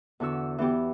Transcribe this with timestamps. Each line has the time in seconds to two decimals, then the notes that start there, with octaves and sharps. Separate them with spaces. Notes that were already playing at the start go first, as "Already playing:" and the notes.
0.20 E2 D3 F#4 E6
0.58 E3 B3 G4